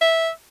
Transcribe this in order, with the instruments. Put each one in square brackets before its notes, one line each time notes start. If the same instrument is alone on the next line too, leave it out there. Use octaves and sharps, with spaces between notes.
[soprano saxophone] E5